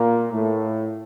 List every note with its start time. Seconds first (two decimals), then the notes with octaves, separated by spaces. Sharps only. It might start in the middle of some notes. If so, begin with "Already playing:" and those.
Already playing: A#2 A#3
0.31 A2 A3